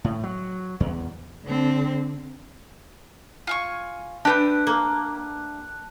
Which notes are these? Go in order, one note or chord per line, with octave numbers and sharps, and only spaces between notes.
A2
F#3
E2
D3 C4
F4 G#5 C#6
A3 C#4 D4 G4 B4 A5 F#6
A#3